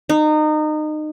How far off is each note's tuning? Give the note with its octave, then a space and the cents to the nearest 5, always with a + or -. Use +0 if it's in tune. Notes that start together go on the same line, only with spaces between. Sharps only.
D#4 -25